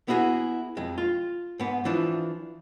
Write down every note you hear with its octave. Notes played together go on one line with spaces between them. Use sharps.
B3 E4 F#4 G#4
F2 G#3
F4
G#2 B3
E3 F3 D4